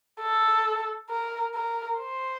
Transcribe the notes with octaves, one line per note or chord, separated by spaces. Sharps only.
A4
A#4
A#4
C5